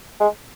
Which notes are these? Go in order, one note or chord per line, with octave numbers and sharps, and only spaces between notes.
G#3